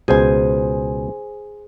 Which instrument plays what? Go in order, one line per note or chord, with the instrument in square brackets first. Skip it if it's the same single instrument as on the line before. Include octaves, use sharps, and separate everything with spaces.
[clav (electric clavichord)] C#2 B2 [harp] G#4 C5 G#5